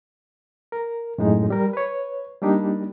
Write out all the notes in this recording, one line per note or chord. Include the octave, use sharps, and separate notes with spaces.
A#4
F#2 A2 G#3 D#4
G3 A#4
B4 C#5
G3 A#3 D4 D#4 G4